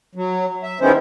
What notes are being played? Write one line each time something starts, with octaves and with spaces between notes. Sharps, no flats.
F#3
E5
D#3 G#3 B3 C#4 E4 C5